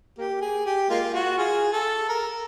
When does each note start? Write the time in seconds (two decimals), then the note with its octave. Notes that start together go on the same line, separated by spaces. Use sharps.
0.18 A#3 G4
0.41 G#4
0.66 G4
0.90 G#3 A#3 F4
1.14 F#4
1.38 F4 G#4
1.73 A4
2.09 A#4